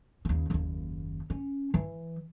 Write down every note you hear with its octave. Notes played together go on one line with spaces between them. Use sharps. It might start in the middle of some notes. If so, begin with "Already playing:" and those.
D#2 C#3
F#1 D#2
C#4
E3